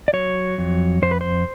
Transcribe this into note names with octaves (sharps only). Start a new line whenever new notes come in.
D5
F#3 C#5
F2
F2 C5
B4
C5